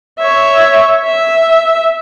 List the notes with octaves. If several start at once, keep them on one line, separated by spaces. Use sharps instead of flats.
C#5 E5
E5